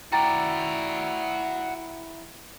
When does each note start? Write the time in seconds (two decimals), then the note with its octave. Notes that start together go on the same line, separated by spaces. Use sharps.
0.12 E4 F#4 D5 G5 A#5 A6